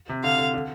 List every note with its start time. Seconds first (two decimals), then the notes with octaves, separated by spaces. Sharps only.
0.09 C3
0.24 D3 F5
0.38 D3
0.54 D3